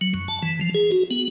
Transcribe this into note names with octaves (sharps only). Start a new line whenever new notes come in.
F#3
F#2
A5
E3
F3
G#4
F#4
B3